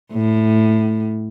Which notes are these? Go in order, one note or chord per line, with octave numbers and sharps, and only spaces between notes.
A2